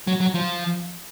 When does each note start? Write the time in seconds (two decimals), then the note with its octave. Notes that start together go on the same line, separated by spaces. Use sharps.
0.07 F#3
0.21 F#3
0.35 F3